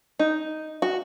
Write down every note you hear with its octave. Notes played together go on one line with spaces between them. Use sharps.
D#4
F#4